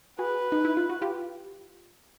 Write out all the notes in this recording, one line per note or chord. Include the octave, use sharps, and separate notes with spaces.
F#4 G#4 B4
D#4
E4
F4
F#4
F4 G4